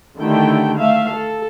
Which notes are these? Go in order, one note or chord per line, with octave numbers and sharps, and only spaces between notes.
D3 D#3 A3 E4 G4 G5
A3 E5 F5
A4